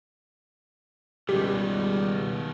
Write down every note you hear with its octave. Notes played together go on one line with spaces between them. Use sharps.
C#2 B2 D#3 G3 G#3 G4